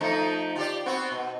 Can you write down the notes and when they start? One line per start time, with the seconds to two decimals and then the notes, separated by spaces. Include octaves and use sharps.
0.01 F3 A3 D#4
0.55 F4 G4 D5
0.86 B3 C4 F#4
1.12 B2